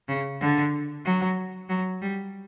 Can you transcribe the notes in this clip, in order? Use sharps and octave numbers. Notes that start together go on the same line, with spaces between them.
C#3
D3
F#3
F#3
G3